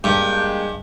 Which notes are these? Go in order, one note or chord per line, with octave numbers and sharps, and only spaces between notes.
G2 G#3 A#3 D4 G4